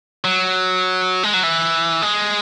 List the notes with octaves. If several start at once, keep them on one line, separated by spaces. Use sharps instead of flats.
F#3
G#3
F#3
E3
G#3